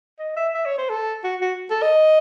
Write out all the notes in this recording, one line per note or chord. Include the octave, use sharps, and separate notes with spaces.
D#5
E5
E5
C#5
C5
A4
F#4
F#4
A4
D#5